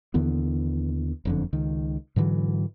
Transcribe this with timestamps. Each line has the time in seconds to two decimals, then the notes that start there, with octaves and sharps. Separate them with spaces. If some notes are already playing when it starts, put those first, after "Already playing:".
0.14 D#2 D3 E3 B3
1.25 F#1 F2 D3
1.53 C#2 D#3
2.16 G#2 D3 E3 F#3